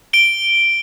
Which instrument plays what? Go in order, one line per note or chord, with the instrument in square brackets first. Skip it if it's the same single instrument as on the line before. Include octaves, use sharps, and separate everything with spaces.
[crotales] D7 G7